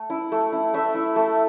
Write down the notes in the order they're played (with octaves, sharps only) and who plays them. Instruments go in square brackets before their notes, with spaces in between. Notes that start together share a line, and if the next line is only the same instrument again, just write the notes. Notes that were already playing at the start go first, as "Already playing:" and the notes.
Already playing: [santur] A3
E4
A3
E4
A3 E5
E4
A3